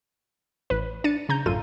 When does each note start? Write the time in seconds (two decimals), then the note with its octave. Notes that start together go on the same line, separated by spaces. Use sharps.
0.70 A1 B4
1.04 D4 A6 C#7 D#7
1.29 C#3 A#5 G6
1.46 A1 F#2 F4 A4 D#7